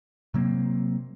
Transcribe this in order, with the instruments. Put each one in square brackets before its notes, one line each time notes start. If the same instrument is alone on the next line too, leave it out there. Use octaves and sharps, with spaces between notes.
[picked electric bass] C3 F#3 A#3 C4